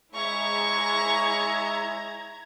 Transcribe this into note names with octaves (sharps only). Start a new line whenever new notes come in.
G#3 E4 G#4 C#5 E5 A#5 C#6 G#6